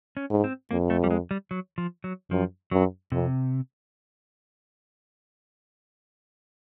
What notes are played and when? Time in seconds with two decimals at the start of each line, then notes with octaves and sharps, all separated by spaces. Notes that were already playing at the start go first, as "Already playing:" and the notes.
0.17 C#4
0.30 G#2
0.44 C4
0.71 F2 A#3
0.90 A3
1.04 G3
1.11 G#3
1.31 G3
1.51 F#3
1.78 F3
2.04 F#3
2.31 F#2 F3
2.71 F#2 F#3
3.12 F2 C3